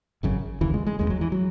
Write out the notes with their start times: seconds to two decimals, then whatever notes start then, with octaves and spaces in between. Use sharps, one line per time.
0.23 G#1 F#2 C#3
0.61 E1 D#2 C#3 E3
0.74 G#3
0.86 G#3
0.99 F#1 E2 C#3 G#3
1.10 F#3
1.21 E3
1.32 F#3